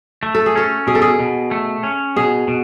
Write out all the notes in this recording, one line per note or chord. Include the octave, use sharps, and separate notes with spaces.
A3
A4
G#4
C#4 A4
B2 G#4
A4
G#4
B2
A3
C#4
B2 G#4
B2